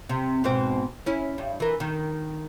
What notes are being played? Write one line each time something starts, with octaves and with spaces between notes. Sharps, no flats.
C3
G#2 B2 C4
C#4 E4
G2
E3 A#4
D#3